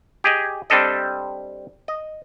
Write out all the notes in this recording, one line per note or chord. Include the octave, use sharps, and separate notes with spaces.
G4 G#4 D#5
G3 C4 D4 A4 D#5
D#5